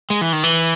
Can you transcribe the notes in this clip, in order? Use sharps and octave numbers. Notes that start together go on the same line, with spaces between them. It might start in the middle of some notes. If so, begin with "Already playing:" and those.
G#3
E3
D#3
E3